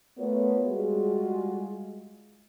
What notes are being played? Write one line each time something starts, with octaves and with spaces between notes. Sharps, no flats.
A3 B3 F4 A#4 C#5
G3 G#3 F4 F#4 G#4